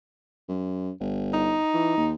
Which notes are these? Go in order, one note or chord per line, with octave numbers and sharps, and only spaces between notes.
F#2
G1
D#4
E3
D#2